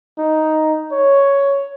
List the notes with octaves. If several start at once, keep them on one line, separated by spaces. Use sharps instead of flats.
D#4
C#5